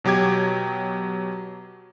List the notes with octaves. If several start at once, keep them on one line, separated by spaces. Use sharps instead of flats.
B2 F#3 G4 D6 G#6